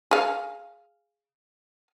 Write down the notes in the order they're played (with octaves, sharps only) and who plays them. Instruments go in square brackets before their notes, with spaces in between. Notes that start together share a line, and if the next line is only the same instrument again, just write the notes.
[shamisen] G#4 F5